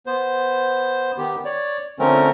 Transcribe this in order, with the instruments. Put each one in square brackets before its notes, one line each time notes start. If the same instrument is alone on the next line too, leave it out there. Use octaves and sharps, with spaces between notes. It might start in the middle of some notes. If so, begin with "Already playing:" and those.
[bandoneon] B3 C5
D#3 B3 G4
C#5 D5
D3 F3 A3 C4 C#4 A#4